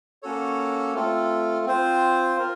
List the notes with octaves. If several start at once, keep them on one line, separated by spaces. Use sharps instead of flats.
A#3 C#4 F#4 A4 C#5
A3 C4 F4 A4
C4 F4 C5
F4 A#4